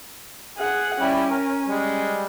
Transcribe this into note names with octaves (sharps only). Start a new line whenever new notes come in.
G#4 F#5
G3 C#4 E4 G4
A#4
G3 G#3